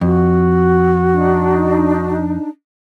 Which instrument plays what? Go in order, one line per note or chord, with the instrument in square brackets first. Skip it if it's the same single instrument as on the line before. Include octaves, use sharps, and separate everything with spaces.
[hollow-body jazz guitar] F2 [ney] F#4
[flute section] D4 D#4